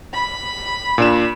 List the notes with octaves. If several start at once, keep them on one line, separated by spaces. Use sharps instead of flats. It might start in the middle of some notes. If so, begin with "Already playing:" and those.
B5
A#2 D4 E7